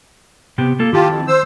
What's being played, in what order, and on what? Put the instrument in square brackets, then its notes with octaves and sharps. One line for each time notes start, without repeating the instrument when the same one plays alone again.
[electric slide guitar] C3 B3 G4
A#3 F4 A4
[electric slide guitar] D#3 E4 A5 [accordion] F4 G4
[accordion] F2
C5 E6